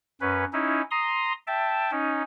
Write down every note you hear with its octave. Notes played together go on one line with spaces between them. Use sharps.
F#2 C#4 B4
C#4 D#4 E4
A#5 C6 D#6
E5 G5 A5
C#4 D#4